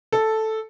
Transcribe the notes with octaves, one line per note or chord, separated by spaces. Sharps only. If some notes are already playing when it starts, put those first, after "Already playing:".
A4